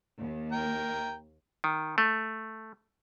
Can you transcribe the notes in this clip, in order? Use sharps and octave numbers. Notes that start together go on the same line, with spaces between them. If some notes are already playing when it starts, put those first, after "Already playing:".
D#2
A#4 G5 A#5
D#3
A3